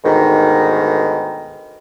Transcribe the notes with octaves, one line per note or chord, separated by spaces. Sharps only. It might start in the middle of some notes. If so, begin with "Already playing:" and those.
D2 G#2 B2 D#3